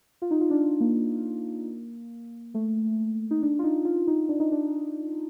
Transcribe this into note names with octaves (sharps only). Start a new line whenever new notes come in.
F4
D#4
F4
D4
A#3
A3
D#4
D4
F4
D#4
F4
D#4
D4
D#4
D4